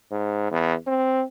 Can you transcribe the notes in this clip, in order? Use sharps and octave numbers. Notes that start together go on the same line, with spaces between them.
G#2
E2
C4